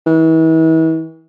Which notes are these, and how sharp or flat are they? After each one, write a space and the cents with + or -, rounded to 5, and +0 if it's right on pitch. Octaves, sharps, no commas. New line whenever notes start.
E3 -40